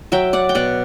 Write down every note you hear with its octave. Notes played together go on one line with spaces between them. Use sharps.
F#3 E5 G5
D5 F#5
G5
B2 D5 F#5